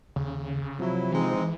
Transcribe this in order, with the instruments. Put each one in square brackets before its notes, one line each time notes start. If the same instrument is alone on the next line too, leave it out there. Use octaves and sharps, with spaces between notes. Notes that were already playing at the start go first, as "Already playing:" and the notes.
[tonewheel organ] D#2 [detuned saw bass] C#3
[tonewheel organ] C3 F3 [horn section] F#3 E4
[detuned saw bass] E3 [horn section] G#3 C4 D#4